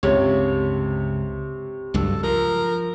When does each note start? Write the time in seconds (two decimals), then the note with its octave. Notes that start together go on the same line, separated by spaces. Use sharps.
0.03 C#2 G2 C3 C#5
1.94 C#2 G2 F#3 A4
2.23 F3 A#4